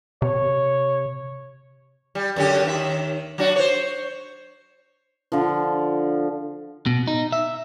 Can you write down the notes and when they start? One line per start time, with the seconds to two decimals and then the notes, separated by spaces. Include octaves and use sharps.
0.22 C3 C#5
2.15 G3
2.36 F#2 D3 G4
2.66 D#2 D#3 E5
3.38 F#3 D4 F#4
3.56 C5 C#5
5.32 D3 F3
6.86 B2
7.07 D#4
7.32 E5